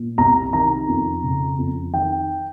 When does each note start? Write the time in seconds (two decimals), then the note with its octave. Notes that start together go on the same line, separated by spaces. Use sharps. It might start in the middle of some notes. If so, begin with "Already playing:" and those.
Already playing: A#2
0.18 C2 A#5
0.53 D#3 A#5
0.88 F2
1.23 C#3
1.58 F2
1.94 D#3 G5